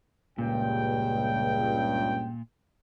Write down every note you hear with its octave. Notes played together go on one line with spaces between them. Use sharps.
C#2 G2 A#2 G5